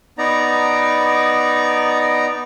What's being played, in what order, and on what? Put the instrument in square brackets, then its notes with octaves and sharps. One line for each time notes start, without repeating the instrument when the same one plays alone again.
[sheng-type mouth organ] B3 D#4 D5 A#5